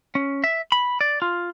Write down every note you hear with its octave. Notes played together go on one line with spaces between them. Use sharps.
C#4
E5
B5
D5
F4